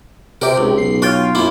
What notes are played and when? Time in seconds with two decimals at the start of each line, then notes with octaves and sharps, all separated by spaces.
0.42 C3 G4 A#4
0.58 C#2 G#2
0.78 B1 C7
1.02 F4 C#5 G5
1.35 F#2 A#3 E4